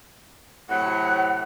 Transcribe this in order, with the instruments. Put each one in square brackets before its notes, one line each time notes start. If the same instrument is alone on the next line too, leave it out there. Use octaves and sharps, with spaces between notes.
[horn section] A2 C3 F#3 [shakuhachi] F#5